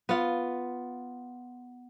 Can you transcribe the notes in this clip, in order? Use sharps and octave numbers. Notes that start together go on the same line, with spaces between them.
B3 F4